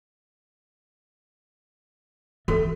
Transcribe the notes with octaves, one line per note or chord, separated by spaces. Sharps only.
E3 F#4 A4